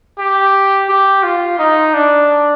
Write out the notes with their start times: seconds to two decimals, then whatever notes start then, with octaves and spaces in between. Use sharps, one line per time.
0.18 G4
0.89 G4
1.23 F4
1.59 D#4
1.94 D4